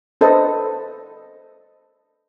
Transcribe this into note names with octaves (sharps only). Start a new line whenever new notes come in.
D4 A4 B4 C5 D#5